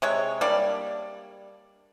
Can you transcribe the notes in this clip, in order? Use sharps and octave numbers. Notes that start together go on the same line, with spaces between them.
C3 G#3 C#5
G3 A#3 D4 D5